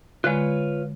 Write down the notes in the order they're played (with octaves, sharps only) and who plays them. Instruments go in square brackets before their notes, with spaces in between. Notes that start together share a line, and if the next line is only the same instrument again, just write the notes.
[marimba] D3 G#3 [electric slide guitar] F4 B4 C#5